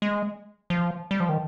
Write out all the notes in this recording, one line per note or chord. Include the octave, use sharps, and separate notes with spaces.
G#3
F3
G3
F3
D#3